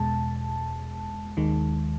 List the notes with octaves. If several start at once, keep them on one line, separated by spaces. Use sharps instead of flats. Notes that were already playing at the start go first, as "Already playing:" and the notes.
Already playing: E2 B2 G#3 A5
D#2 D#3 G#3